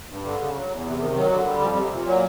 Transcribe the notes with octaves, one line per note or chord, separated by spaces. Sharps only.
G2
D3
C#3
F#3
E2
C3
D#3
F#3
D3
G3
F2
C3
A#2
F#3